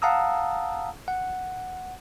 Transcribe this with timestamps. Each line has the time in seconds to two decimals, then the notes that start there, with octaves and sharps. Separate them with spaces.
0.02 F5 F#5 A5 A#5 D#6 E6
1.08 F#5